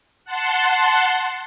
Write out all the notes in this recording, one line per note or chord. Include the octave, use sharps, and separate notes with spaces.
F#5 A5 C6